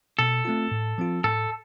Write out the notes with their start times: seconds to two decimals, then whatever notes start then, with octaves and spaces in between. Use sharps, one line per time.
0.19 B2 A4
0.45 A3 C4 F4
0.72 A2
0.98 F3 C4 F4
1.24 A2 A4